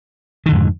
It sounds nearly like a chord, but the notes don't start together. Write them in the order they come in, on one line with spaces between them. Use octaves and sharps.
D#3 D3 F2 G#2